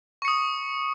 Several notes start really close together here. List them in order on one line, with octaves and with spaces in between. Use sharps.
C#6 C#7 D#6